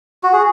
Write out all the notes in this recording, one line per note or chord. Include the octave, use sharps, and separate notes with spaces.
F#4
G#4